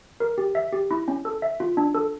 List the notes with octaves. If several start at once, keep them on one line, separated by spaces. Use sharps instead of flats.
A#4
G4
E5
G4
E4
C#4
A4
E5
F4
D4
A4